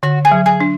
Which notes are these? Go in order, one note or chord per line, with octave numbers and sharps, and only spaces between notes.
D3 F#4
G#4
F#3
G#4
D4